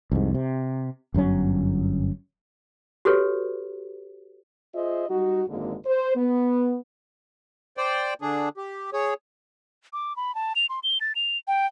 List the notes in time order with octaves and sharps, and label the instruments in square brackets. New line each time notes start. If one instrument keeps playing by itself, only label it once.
[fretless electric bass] C2 F2 G#2
C3
G1 F#2 F#3 C#4
[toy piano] F#4 G4 A4 B4 C#5
[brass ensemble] F4 G#4 C5 D#5 E5
G3 D#4 F#4
G#1 F#2 D3 G#3 A#3
C5
B3
[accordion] C5 D5 G5
D3 D4 G#4
G4
G#4 C#5
[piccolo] D6
B5
A5
F7
C6
G7
A6
F7
G5